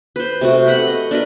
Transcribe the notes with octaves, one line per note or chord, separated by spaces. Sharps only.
B4 C5
C3 A3 F#4
B4 F#5 B5
D#5
D4 A#4 B4